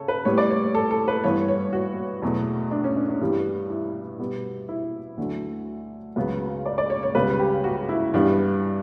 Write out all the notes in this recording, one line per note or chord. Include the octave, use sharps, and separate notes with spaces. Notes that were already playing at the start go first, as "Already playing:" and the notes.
Already playing: C#3 A4 C#5
B4
A2 G3 B3 C#5
D5
C#5
A4
A4
B4
G2 E3 B3 C#5
C#5
F#4
E2 B2 F#3 A3
D4
C#4
D4
D4
G2 E3 G3 B3
E4
B2 G3 B3
E4
D2 D3 F#3 A3
C#2 C#3 F#3 B3
D5
D5
C#5
C#5
C#2 C#3 G3 B3 B4
G4
F#4
E4
G2 E3 G3 B3 D4